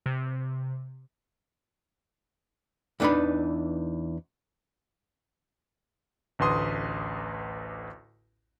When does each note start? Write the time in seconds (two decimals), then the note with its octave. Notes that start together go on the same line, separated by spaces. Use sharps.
0.06 C3
3.00 E2 E3 D4 D#4 B4 B5
6.39 A1 D2 B4 C6 D#6